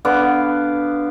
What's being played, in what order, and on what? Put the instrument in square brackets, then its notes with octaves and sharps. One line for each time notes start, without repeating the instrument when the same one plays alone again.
[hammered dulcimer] D3 B3 F5 D6